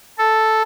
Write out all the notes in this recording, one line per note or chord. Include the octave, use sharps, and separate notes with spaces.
A4